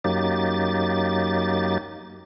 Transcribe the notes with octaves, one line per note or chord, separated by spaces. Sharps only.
F#2 F#3 A#3 D#4 G4 A6